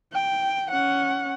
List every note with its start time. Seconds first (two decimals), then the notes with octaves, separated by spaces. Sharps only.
0.13 G5
0.71 C#4 F#5